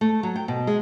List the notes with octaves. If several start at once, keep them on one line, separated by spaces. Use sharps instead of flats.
A3
F#3
G5
B2
G#3